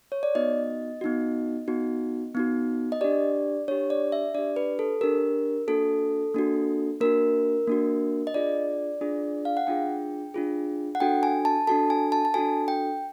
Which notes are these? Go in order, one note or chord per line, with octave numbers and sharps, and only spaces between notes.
C#5
D5
B3 D#4 F#4 D#5
B3 D#4 F#4
B3 D#4 F#4
B3 D#4 F#4
D#5
D4 G4 D5
D4 G4 C#5
D5
E5
D4 G4 D5
B4
A4
D4 G4 A#4
A#3 D4 F#4 A4
A#3 D4 F#4
A#3 D4 F#4 A#4
A#3 D4 F#4
D#5
D4 F4 G#4 D5
D4 F4 G#4
F5
F#5
D4 F4 G#4 G5
D4 F4 G#4
F#5
D4 F#4 A4 G5
G#5
A5
D4 F#4 A4 A5
G#5
A5
A5
D4 F#4 A4 G#5
G5